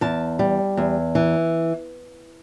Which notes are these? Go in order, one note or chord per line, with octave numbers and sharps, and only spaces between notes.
E2 A5
G3
E2
E3